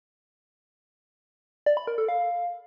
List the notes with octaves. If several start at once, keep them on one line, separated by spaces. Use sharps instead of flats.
D5
B5
A#4
A4
F5